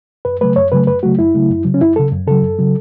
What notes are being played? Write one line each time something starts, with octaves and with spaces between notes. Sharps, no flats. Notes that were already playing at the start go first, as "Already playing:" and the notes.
F#2 B4
C#3 F#3 A3 B4
F#2 C#5
C#3 F#3 A3 B4
F#2 B4
C#3 F#3 A3 F#4
F#2 E4
C#3 F#3 A3
F#2
C#3 F#3
C#4
F#2 E4
C#3 F#3 A4
F#2
C#3 F#3 A4
F#2
C#3 F#3